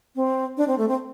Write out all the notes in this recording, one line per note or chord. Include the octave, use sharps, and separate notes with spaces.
C4
D4
C4
A3
C4